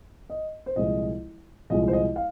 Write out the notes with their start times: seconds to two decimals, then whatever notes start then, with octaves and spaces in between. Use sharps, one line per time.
0.30 D#5
0.66 C5
0.76 C2 A#2 F3 G#3 D#5
1.70 C2 A#2 F3 G#3 D#5
1.88 C5
1.93 D#5
2.16 F5